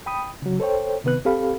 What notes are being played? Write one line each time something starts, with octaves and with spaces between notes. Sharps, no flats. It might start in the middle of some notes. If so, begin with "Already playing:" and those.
G5 B5 D#6
C#3 F#3
A4 C5 C#5 G5
C3 D#3 B3 B4 F#6
C4 G4 A4 F5 B5